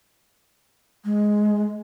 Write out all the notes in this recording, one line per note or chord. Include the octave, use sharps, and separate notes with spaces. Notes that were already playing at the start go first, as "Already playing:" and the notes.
G#3